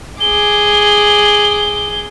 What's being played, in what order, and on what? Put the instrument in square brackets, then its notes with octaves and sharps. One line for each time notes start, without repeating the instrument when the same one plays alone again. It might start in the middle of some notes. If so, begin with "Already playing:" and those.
[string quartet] G#4 D6 [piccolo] G7